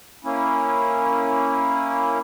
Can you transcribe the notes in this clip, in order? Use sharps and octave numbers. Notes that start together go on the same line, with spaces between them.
A#3 C#4 E4